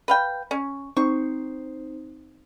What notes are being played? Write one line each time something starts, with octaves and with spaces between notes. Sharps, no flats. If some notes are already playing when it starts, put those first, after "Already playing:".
B4 F5 G5
C#4
C4 D#4 C5 C#6